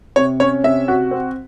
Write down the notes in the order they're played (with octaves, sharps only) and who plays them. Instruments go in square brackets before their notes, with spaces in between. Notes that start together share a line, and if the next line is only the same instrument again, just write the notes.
[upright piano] C3 [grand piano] C#5
[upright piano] C#4 [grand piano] C#5
[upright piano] C3 [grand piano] E5
[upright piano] F#4
C4